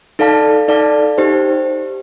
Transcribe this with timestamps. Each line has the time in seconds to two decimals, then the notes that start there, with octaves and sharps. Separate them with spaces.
0.19 D#4 A4 D5 F5 A5
0.68 D#4 A4 D5 F5 A5
1.18 D#4 G4 C5